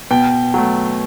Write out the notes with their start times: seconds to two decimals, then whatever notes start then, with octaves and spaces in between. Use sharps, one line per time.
0.11 B2 G5
0.54 F#3 A3